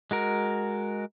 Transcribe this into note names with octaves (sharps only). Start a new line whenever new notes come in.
G#3 F#4 A#4